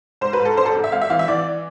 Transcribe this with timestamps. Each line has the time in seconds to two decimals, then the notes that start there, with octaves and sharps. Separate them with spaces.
0.21 G#2 C5
0.33 B4
0.40 G#2
0.45 A4
0.57 G#1 C5
0.66 A4
0.75 G#1
0.84 E5
0.92 G#1 F5
1.01 E5
1.10 E3 F5
1.19 E5
1.28 E3 D5